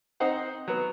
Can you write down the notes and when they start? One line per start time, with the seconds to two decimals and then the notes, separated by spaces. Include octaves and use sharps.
0.20 C4 D#4 C5 F#5
0.68 F#3 B3